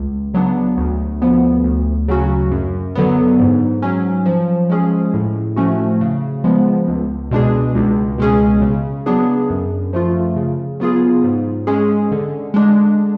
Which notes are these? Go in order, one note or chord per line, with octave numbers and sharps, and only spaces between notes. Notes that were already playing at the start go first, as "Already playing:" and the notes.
Already playing: C#2
C#3 F#3 B3 D4
D2
D3 F3 B3
D2
C#3 F#3 C#4 F#4
F#2
D3 F#3 B3
G#2
F#3 C#4
F3
G#3 C#4 G#4
A2
F3 A3 C#4 F#4
C#3
F3 G#3 B3
C#2
B2 G#3 D4 G#4
C#2
B2 G#3 C#4 G#4
C#3
F#3 B3 D4 G#4
F#2
F3 A3 F4
C#3
F#3 B3 F4 G#4
G#2
G#3 C#4 G#4
D3
G#3 D4